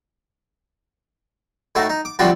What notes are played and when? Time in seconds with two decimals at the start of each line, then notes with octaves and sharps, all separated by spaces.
1.75 A2 A3 D#4 F#4
1.90 D#4
2.05 D6
2.19 D3 F3 G3 A3 C4 F#4